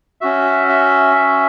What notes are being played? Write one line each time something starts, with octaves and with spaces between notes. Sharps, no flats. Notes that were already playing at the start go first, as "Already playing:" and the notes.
C#4 F#4 E5
E5
E5